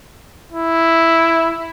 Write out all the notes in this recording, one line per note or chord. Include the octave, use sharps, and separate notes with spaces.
E4